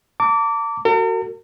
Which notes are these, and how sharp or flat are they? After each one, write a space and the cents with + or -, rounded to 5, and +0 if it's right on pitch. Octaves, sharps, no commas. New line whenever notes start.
A5 +45 D6 -20
F#4 +10 A#4 -45